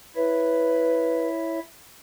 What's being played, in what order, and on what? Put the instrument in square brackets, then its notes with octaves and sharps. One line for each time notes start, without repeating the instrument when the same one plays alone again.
[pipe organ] E4 C#5 E5 [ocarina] B4